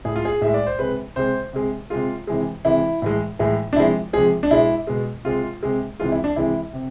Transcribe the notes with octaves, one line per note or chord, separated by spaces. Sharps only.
A2 G#3 G#4
F4
G#4
A2 G#3 E5
D5
C5
C3 G#3 B4
C3 G#3 C5
C3 G#3
C3 G#3 F4
C3 E3 G#3
C3 E3 G#3 E4
A2 E3 G#3
A2 E3 G#3
D4
C3 F3 G#3 E4
C3 F3 G#3 G#4
D4
B2 G#3 E4
B2 G#3
C3 G#3 F4
C3 G#3
C3 E3 G#3 F4
E4
D4
C3 E3 G#3 E4
C3